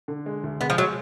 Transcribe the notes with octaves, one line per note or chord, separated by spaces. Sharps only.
D3
G#3
D2
G#3 B3
F3
F#3 G#3